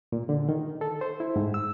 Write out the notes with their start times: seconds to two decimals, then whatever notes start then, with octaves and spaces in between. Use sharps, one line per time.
0.12 A#2
0.29 D3
0.49 D#3
0.81 A4
1.01 C5
1.20 E4
1.36 G#2
1.54 E6